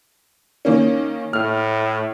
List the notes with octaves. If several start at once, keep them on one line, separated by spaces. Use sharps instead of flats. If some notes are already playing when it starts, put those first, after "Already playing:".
D#3 A#3 C#4
A2 F6